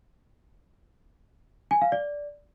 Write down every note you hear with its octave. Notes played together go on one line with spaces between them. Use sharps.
G#5
F5
D5